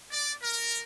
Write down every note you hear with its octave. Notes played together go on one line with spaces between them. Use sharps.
D5
A#4